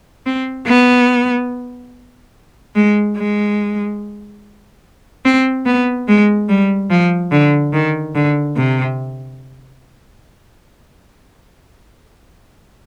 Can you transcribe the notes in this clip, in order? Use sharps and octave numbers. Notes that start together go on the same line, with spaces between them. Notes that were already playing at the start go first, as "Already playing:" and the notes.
C4
B3
G#3
G#3
C4
B3
G#3
G3
F3
D3
D#3
D3
C3